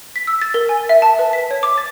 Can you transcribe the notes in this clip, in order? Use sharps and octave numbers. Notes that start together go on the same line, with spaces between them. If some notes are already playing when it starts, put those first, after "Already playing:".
B6
E6
A6
A#4
G#5
E5
A5
B4
B6
C#5
D6
A6